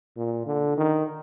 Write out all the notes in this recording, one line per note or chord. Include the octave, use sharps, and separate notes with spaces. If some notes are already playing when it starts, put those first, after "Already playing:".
A#2
D3
D#3